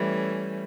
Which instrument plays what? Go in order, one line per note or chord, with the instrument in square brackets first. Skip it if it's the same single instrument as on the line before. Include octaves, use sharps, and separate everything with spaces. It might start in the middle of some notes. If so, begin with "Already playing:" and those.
Already playing: [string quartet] E3 A3 C#4 [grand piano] G3